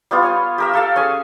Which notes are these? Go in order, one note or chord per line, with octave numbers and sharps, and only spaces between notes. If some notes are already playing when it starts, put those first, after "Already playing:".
G3 B3 F4
C#5 G#5
G4 A#4 E5
G4 A4 F5
C#4 G#4 G#5